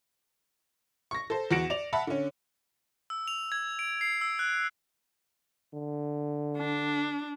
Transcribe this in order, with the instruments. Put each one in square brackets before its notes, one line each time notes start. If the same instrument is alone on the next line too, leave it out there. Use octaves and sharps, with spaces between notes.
[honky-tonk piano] C#6 A#6
A4 C5
E2 F#4 A#6 C#7 D7 E7
D5 F7
E5 F#5 A5 B5
D3 C#4
[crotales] E6
F7
G#6
D7
C7
E6
F#6
[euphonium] D3
[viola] D4